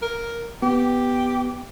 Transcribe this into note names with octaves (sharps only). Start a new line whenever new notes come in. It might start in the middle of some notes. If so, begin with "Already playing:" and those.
A#4
B3 G4